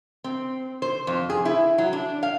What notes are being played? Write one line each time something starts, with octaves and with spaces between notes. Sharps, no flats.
C4
C5
F2
G#4
E4
F#3
D4
F5